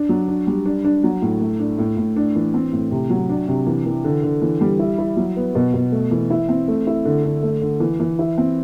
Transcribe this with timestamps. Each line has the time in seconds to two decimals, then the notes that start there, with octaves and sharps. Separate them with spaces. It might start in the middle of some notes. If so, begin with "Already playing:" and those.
Already playing: D4
0.09 F#3
0.28 D4
0.47 G3
0.65 D4
0.84 D4
1.04 F#3
1.22 A2
1.41 A3
1.59 D4
1.78 A2
1.97 A2
2.16 D4
2.35 E3
2.54 C4
2.73 A2
2.91 C3
3.10 F#3
3.29 D4
3.48 C3
3.67 E3
3.86 E3
4.04 D3
4.23 D3
4.42 E3
4.61 G3
4.79 E4
4.98 E4
5.17 F#3
5.36 B3
5.55 B2
5.74 B2
5.92 A3
6.11 E3
6.30 E4
6.49 C4
6.68 A3
6.87 E4
7.05 D3
7.24 D3
7.43 A3
7.62 D3
7.80 E3
8.00 E3
8.19 E4
8.38 C4